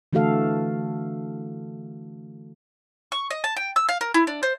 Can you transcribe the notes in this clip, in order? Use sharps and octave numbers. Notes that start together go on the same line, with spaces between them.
D3 E3 A3 F#4 A4 F5
C#6
D#5
A5
G5
E6
F5
A#4
E4
D4
C5